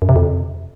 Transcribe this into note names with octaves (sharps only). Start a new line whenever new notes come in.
F#2
C3
F2